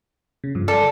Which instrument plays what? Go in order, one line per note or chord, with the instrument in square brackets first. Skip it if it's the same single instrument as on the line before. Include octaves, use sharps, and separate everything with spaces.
[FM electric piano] C#3
G2 F3
[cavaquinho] A4 [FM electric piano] D5